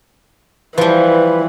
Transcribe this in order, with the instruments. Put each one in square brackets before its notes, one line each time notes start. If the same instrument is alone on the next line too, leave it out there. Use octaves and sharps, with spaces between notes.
[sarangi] E3 [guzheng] F3 G3 [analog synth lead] B4